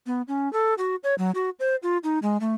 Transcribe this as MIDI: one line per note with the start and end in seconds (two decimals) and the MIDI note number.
0.07 0.22 59
0.28 0.51 61
0.53 0.74 69
0.78 0.96 66
1.04 1.15 73
1.18 1.31 54
1.35 1.50 66
1.60 1.76 72
1.83 1.98 65
2.04 2.19 63
2.22 2.37 56
2.41 2.55 57